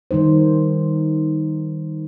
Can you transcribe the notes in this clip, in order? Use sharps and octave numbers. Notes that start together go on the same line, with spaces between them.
D#3 G3 D#4 C5